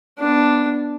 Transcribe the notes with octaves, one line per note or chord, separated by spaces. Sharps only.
B3 D4